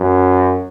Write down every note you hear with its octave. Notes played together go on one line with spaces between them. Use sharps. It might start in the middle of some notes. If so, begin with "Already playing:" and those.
Already playing: F#2